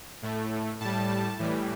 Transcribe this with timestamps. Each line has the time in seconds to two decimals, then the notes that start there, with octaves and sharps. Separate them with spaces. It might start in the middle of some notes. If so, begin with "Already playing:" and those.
0.22 A2 A3
0.80 A2 G3 A5
1.39 A2 E3 G3